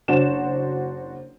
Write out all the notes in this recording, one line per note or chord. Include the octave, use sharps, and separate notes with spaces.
F#1 D4 F#4 C5 E7